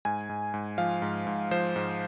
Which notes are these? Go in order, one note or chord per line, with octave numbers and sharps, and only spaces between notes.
G#2 G#5
G#2
G#2
F3 F5
G#2
G#2
F3 C5
G#2